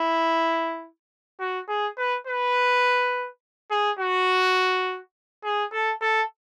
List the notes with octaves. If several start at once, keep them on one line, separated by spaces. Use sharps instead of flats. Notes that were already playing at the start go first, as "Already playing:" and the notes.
Already playing: E4
F#4
G#4
B4
B4
G#4
F#4
G#4
A4
A4